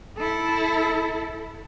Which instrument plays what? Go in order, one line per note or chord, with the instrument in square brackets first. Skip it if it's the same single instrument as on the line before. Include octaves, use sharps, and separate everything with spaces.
[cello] E4 A4